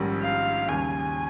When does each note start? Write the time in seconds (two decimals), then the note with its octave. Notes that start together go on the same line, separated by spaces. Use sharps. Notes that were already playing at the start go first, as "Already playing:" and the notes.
Already playing: A#1 G#2 D#3 G3 C#4
0.23 F5
0.68 D#2 C#3 G3 G#5